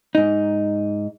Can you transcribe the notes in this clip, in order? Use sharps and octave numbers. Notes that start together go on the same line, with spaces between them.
G#2 D#4